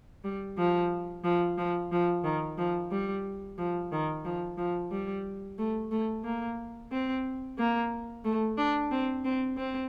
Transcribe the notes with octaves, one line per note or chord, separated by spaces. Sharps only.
G3
F3
F3
F3
F3
D#3
F3
G3
F3
D#3
F3
F3
G3
A3
A3
A#3
C4
A#3
A3
D4
C4
C4
C4